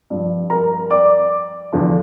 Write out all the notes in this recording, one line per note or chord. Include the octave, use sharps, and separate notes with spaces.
G2 F3
A#4 A#5
D5 D6
E2 D3 F3